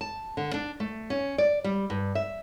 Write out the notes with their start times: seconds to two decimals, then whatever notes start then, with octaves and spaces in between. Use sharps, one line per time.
0.01 A5
0.37 D3
0.54 D4
0.80 A3
1.10 C#4
1.38 D5
1.64 G3
1.90 G2
2.15 E5